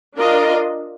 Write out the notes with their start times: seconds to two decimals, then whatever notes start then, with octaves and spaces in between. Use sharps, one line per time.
0.17 D4 F4 A#4 D#5